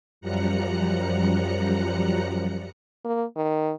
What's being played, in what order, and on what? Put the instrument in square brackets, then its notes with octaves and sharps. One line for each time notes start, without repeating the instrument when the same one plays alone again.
[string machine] F#2 F3 G3 A#5 F#6 C#7
[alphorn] A#3
D#3